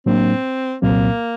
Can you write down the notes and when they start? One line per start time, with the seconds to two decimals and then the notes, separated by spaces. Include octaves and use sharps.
0.06 A2 F#3 A#3 C4 D4
0.82 C2 A#2 F#3 A#3 C4